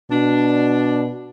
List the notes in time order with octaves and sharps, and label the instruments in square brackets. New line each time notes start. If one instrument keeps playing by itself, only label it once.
[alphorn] B2 [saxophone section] D4